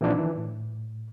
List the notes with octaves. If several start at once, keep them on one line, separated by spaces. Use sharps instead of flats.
A#2 E3 F3 C4 D4 D#4
D#3 E3
A2